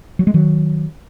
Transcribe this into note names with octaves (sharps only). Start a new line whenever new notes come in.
F#3
G#3
D#3 F#3